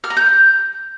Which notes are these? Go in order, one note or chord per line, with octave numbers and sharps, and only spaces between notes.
F6
A#5
G6